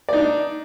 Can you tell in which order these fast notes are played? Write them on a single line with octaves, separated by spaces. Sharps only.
D5 D#4 D4